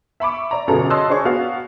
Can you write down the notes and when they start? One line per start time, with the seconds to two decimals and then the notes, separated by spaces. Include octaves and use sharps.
0.20 E5 B5 C#6 D6
0.51 D5 A#5
0.67 G1 F#2 B2 G#4 A4 A#5
0.90 C#5 D#5 A5 C6 E6 F#6
1.09 D4 G#4 C5 C#5 C#6
1.25 B3 F#4 F5